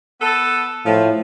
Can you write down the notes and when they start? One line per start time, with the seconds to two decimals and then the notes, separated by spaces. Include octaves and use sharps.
0.21 B3 A4
0.86 A2 F3